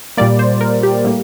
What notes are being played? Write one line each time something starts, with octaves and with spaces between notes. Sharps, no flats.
A#2 G3 A#3 D5
C5
A#4
G4
A2 G3 A#3